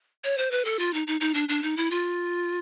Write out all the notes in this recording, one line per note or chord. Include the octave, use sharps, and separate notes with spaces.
C#5
C5
B4
A4
F4
D#4
D#4
D#4
D4
D4
D#4
E4
F4